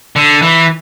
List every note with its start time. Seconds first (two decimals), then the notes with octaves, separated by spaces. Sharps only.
0.16 D3
0.42 E3